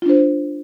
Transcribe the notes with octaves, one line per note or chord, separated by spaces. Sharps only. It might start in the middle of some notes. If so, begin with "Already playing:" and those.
D4 F4 C5